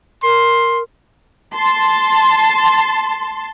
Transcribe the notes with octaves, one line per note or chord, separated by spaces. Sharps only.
A#4 C6
A5 C6